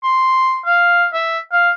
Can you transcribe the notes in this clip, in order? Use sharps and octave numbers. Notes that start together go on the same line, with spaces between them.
C6
F5
E5
F5